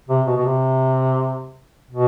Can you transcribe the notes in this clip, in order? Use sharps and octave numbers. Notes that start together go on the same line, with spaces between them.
C3
B2
B2
C3
B2